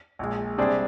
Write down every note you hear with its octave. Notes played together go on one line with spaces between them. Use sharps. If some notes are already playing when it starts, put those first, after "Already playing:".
A#1 A#2 G#3
C3 G3 D4 G#4 C5